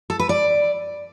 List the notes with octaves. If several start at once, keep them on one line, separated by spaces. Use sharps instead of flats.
A4
B4
D5